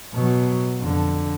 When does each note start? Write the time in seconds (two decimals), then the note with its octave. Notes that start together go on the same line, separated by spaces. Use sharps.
0.13 B2 F#3
0.78 F2 D3